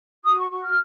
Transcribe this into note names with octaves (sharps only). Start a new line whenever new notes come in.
F#4 D#6
C#6
F#4 C#6
F6